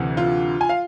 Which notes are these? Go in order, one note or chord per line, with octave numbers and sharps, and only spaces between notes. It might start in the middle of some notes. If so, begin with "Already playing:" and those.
Already playing: D2 C3 E3
F4
G#5
F5